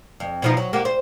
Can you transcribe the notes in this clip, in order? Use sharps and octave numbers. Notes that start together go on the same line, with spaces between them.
F2
B2 F3 D#4
F#3
A#3 F#4 G4
C5